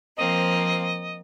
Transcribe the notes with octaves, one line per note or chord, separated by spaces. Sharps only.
F3 A#3 C4 D#5